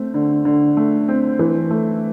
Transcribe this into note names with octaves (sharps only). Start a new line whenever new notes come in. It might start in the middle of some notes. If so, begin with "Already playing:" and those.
Already playing: A3 C4
D3
D3
A3
C4
E3
A3